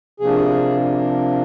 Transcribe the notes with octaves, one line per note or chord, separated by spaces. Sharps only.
C3 F3 A#3 D4 G#4